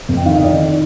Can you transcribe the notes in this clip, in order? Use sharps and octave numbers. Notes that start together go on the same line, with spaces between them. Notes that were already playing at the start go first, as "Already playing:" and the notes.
F2
G5
D#3 F5
D#5
D#3 D5
D#3